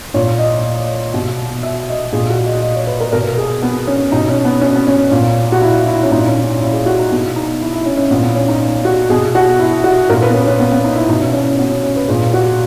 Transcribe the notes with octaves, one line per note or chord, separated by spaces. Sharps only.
A#2 C#5
D#5
B2
E5
D#5
A#2 G#4
F#4
D#5
D#5
C#5
B4
A#4
B2 A#4
G#4
B3
C#4
B2 D#4
C#4
B3
C#4
B3
C#4
A#2
F#4
E4
E4
C#4
A#2 D#4
C#4
C#4
E4
G#4
F#4
D#4
B2 B3
D#4
E4
E4
C#4
C#4
A#2 B3
B3
C#4
D#4
F#4
B2 G#4
F#4
E4
F#4
A#2 A#4
B4
B3
C#4
C#4
B3
B3
D#4
E4
B2 D#4
C#4
C#4
C#4
B3
C#4
C#4
B4
A#2 G#4
F#4